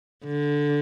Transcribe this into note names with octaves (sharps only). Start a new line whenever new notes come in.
D3